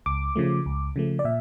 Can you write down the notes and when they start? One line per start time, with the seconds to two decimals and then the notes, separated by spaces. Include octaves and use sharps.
0.06 C#2 D6
0.36 C#3 F3 A3
0.66 C#2
0.96 C#3 F3 A3
1.19 D5
1.24 A#2 E5